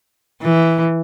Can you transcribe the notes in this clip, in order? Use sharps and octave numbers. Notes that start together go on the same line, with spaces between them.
E3